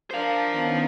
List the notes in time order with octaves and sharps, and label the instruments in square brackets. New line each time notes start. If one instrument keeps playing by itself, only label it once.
[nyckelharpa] D4 A#4 [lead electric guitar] C5 F5
[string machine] D#3 B3 C#4